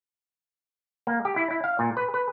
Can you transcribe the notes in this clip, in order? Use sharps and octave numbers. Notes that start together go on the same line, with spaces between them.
A#3
G4
E4
E4
F5
A#2
B4
B4